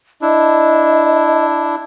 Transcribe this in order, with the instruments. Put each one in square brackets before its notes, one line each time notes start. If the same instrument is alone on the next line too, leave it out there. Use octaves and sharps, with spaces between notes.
[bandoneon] D4 E4 [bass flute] D#5